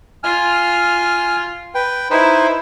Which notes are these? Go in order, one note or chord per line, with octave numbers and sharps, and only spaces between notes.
F4 G#5 F6
B4 G5
D#4 E4 B4 C5